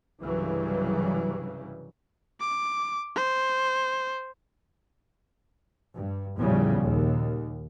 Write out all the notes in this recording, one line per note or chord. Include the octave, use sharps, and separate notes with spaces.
C2 G2 C#3 E3 F#3 G3
D6
C5
G2
E2 A2 C#3 F3 G3
D#2 A#2